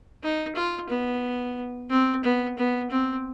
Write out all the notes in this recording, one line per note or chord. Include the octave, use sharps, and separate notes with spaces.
D#4
F4
B3
C4
B3
B3
C4